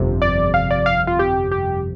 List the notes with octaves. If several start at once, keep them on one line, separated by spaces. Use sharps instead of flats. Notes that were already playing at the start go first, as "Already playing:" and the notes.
Already playing: G1 F2 C3
D5
F5
D5
F5
F4
G4
G4